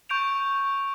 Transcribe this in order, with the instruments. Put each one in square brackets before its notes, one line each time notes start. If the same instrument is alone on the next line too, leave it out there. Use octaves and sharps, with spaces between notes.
[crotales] C#6 G6 D7 F7